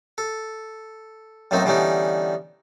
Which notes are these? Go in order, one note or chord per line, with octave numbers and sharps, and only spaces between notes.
A4
F#2 A2 F#3 A#3 C4 D#4
D3 E3 G3 B3 C#4 D#4